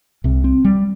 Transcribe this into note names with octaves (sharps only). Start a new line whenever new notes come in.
C2 C3
C4
G3